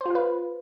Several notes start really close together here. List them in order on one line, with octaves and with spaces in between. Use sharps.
C5 F4 F5 B4